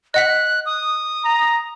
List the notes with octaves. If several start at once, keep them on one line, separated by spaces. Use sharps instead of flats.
D#5 F#5 F#6 B6
D#6
A#5